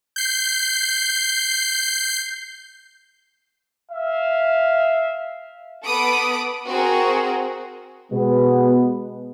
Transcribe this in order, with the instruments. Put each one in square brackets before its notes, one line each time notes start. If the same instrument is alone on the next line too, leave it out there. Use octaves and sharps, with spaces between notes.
[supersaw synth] G6 C7
[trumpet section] E5 F5
[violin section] B3 A4 B5 D6 D#6 D7
C4 F#4 G#4 A#4
[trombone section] B2 G#3 B3